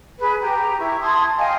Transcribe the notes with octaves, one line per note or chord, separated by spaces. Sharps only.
G#4 B4
G4 G5 A#5
E4 C#6
A5 C6 D#6 G#6
D#5 F5 G5 G#5